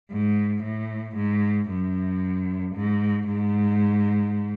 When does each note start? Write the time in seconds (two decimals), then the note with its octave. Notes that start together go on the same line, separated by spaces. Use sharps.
0.11 G#2
0.63 A2
1.16 G#2
1.69 F#2
2.75 G#2
3.27 G#2